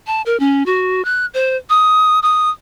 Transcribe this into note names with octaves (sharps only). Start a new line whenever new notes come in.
A5
A#4
C#4
F#4
F#6
C5
D#6
D#6